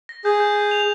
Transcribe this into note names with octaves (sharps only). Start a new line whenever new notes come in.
A#6
G#4 G6
G6
G6
F7